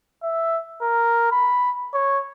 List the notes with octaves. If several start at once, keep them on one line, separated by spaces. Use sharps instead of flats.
E5
A#4
B5
C#5